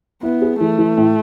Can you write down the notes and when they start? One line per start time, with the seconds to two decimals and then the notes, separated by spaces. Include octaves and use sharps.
0.23 B3 E4
0.42 G#4
0.60 E3 A3
0.78 E3
0.97 A2